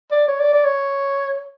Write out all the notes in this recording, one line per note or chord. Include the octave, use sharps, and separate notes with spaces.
D5
C#5
D5
D5
C#5